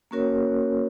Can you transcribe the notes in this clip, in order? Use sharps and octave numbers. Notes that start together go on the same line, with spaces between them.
A#3 C#4 F#4 A#4 C#5